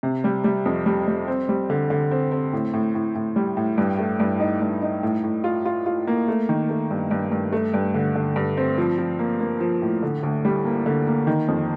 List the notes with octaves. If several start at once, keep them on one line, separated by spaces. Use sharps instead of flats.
C3
G3
G3
F2
G3
G3
C4
G3
D3
D3
C4
C4
A2
A2
A2
A2
G3
A2
G2
A3
G2
D#4
G2
D#4
A2
A2
F4
F4
F4
A#3
A3
D#3
A3
G2
G2
G2
A3
G2
D3
D3
G2
C4
F3
F3
A#3
A#3
F3
A2
D3
D2
G3
A#3
D3
A#3
D#3
F2